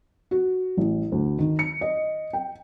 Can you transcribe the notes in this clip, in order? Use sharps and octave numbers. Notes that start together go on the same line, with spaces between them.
F#4
A1
D2
D#3
C#7
D#5
G5